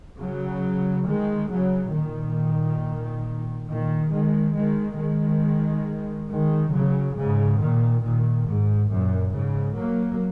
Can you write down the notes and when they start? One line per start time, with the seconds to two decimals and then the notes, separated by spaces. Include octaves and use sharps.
0.20 C#3 F#3
1.07 D#3 G#3
1.50 C#3 F#3
1.94 A#2 D#3
3.68 A#2 D#3
4.11 D#3 G#3
4.55 D#3 G#3
4.98 D#3 G#3
6.29 D#3 G#3
6.72 C#3 F#3
7.16 G#2 C#3
7.59 A#2 D#3
8.02 A#2 D#3
8.46 G#2
8.90 F#2 A#2
9.33 G#2 C#3
9.76 F#3 A#3